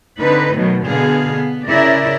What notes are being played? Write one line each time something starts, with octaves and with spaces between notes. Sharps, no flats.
D3 C4 D#4 B4
B2 D#3 F#3 A3
B2 D3 B3 G#4 F5
B3
C#3 E4 A#4 D5 E5